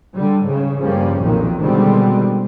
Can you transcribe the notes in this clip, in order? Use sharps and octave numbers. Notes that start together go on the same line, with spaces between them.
D3 G3
G#2 C#3
G2 F3 G3 A#3 C#4
B1 F2 A#2 D#3
B2 D3 D#3 G3 G#3 C4